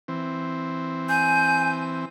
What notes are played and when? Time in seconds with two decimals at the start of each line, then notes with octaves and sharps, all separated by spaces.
0.08 E3 C4
1.09 G#5 G6